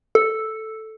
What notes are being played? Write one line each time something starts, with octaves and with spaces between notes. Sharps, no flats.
A4